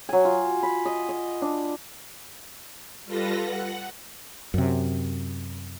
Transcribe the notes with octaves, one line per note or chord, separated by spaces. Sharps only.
F#3 G#5
F4
B5
D#5
D#5
D4
G3 F4 A4 B4 A#6
F#5
F#2 C3